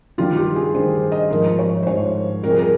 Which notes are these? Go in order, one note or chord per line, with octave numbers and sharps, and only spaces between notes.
G2 D#3 G3 F4
G4
G#4
G2 D#3 G3 C5
D#5
G#2 F3 A#4
C#5
C5
G#2 F3 C#5
F2 C3 G3 A#4
G#4
A#4